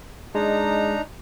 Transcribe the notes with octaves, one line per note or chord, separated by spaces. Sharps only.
G#3 D4 D#4 A#5